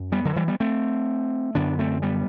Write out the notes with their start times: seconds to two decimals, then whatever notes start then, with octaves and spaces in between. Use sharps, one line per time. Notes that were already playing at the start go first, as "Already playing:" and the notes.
Already playing: F#2
0.12 G3 B3
0.25 D3 F#3
0.36 E3 G3
0.48 G3 B3
0.60 A3 C4
1.55 F#2 D3 B3 D4
1.79 A3 C4
2.02 G3 B3